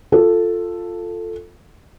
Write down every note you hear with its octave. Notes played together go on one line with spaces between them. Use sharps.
F4 A4